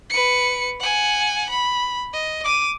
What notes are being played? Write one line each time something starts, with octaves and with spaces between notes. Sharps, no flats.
B4 C#7
F#5 G#5
B5
D#5
D6 D#7